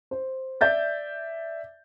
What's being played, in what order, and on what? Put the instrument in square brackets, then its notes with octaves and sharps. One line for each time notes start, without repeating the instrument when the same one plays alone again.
[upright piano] C5
D5 E5 G6 A6